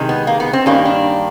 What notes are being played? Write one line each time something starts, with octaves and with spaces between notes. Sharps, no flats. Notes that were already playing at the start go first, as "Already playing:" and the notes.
Already playing: C3 D#3 G#3
B3
A#3
B3
C4
G2 D#3 G3 A#3 C#4
D4